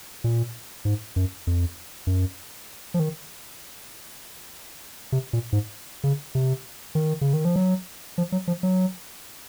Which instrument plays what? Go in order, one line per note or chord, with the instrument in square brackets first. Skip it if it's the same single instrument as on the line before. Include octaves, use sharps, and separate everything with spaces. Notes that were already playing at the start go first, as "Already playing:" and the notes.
[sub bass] A#2
G#2
F#2
F2
F#2
F3
D#3
C3
A#2
G#2
C#3
C3
D#3
C#3
D#3
F3
F#3
F3
F#3
F3
F#3